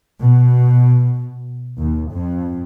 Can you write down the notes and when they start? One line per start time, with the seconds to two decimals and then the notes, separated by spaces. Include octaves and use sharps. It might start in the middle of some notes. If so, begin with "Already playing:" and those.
0.19 B2
1.79 D#2
2.13 F2